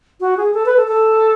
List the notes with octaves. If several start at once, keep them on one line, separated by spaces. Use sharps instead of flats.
F#4
G#4
A4
B4
A4
A4